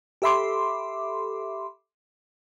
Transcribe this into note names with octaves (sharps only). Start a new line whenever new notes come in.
G4 A4 E5 B5 C6 D6